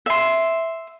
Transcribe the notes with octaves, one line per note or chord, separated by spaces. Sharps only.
E5 C6